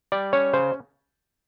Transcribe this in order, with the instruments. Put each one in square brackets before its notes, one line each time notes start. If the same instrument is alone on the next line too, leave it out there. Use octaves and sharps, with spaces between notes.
[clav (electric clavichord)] G3 [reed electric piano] D5
[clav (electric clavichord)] C#4 [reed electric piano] C#5
[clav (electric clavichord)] C#3 [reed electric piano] C5